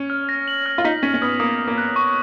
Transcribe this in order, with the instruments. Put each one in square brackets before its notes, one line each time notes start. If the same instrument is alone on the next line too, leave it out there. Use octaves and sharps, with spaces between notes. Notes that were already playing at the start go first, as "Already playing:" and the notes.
Already playing: [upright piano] C#4
[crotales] F6
A#6
F#7
F6
[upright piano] F4
[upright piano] D#4 [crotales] B6
[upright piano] C#4 [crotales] B6
[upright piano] C#4
[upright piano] B3 [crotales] D#6
[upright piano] A#3 [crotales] D#6
[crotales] D#6
[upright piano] A#3
[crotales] F#6
C#6